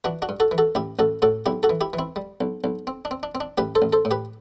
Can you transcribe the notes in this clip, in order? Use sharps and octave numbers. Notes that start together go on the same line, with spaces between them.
E3 D4 F#4
D4 F#4
G2
F#4 A4
E3
F#4 A4
A1 E4 G4
A1 F#4 A4
A2 F#4 A4
B1 E4 G4
F#4 A4
E3
E4 G4
E3
C4 E4
G3
B1
B1
C4
D4
C4
D4
C4
D4
A1 G4 B4
A4 C5
A1
A4 C5
A2
G4 B4